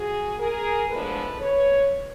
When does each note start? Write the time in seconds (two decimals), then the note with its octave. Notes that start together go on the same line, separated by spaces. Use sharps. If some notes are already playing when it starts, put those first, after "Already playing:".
Already playing: F#4 G#4
0.38 G#4 A#4
0.89 A2 F3 G#3 B3 D4 A4 B4
1.40 B4 C#5